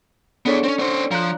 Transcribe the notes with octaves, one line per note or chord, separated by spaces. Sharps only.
B3 D4 G#4 A4 C#5
C4 C#4
C#4 C5
F3 A#5 F#6